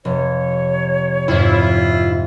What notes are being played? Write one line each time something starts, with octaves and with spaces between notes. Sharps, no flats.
F1 C#5
F2 G#2 E4 F4